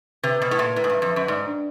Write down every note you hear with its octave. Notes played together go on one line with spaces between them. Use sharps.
C3 B4
B2 B4
A2
A#2 E5
A2 B4
G#2
G2 E5
F2
F#2 E5
G#2 D5
D4